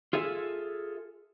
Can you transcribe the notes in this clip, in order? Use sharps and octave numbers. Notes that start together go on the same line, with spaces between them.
F4 G#4 A4 E5